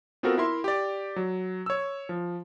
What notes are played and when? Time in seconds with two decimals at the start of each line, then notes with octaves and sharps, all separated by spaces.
0.23 B3 C4 F4 F#4 A4 A#4
0.38 E4 A#4 E5 C6
0.64 G4 D5
1.16 F#3
1.66 C#5 E6
2.09 F3